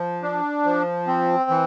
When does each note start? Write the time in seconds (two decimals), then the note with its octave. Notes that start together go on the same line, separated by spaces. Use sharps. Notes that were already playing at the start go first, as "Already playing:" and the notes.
Already playing: F3
0.22 D4
0.65 F3
1.07 C4
1.50 E3